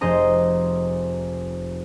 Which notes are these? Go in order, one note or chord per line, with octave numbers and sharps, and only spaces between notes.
F1 G#4 C5 D#5 A#5